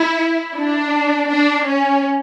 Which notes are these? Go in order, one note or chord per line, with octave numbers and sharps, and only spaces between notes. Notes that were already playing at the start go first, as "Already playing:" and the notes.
Already playing: E4
D4
D4
C#4